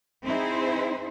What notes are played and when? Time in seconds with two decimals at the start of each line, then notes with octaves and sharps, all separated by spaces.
0.24 C4 D#4 E4 G#4 C5